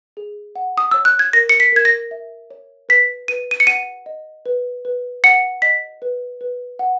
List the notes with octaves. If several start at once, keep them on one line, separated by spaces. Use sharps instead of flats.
G#4
F#5
D#6
C#5 E6
F#6
G#6
A#4 A#6
C#7
B6
A#4 G#6
A#6
E5
C#5
B4 B6
B4 D#7
D#7
C#7
F#5 D#7
D#5
B4
B4
F#5 C#7
D#5 B6
B4
B4
F#5